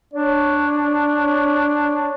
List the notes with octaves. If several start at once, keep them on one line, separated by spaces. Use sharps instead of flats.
D4 C#5